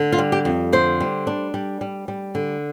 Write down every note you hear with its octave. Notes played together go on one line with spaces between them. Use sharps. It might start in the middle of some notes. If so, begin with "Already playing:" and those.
Already playing: D3
F4
G3
G4
F2
D3 C5
G3
D4
G3
G3
G3
D3